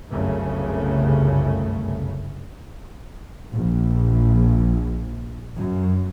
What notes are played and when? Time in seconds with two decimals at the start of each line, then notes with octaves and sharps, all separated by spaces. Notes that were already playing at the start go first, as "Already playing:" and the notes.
0.10 G1 C2 F#2 C#3 A3
3.52 A#1
5.57 F#2